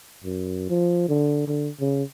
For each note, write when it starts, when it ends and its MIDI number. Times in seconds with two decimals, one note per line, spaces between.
0.24 0.66 42
0.70 1.07 53
1.09 1.47 50
1.47 1.70 50
1.80 2.04 49